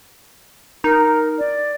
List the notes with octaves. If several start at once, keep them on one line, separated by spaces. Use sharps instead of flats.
D#4 A#4
D5